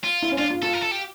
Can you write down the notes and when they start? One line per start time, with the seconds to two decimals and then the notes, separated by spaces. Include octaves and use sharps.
0.04 F4
0.22 E4
0.31 C#4
0.39 D4 F4
0.51 F4
0.62 F4 A4
0.73 A#4
0.82 A4
0.91 G4